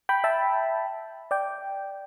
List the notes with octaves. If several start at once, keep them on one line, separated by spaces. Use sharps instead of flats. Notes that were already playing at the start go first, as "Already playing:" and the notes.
G5 B5
E5 A5
D5 G5